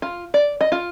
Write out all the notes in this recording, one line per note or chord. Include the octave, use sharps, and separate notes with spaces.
F4
D5
D#5
F4